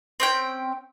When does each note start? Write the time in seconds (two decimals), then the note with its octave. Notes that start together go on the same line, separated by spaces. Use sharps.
0.20 C4 C#4 G5